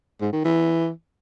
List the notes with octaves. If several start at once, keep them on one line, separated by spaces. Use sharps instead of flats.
G#2
D#3
E3